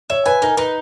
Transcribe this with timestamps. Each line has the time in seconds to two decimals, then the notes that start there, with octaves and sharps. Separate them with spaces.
0.10 C#5 E5
0.26 B4 G#5
0.42 D#4 A#4
0.57 D#4 B4